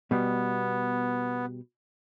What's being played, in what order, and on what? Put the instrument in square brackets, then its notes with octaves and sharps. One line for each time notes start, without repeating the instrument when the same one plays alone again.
[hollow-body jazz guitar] B2 G3 [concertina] B3